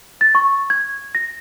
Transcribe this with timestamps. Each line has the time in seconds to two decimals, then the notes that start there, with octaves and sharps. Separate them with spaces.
0.21 A6
0.35 C#6
0.70 G#6
1.15 A#6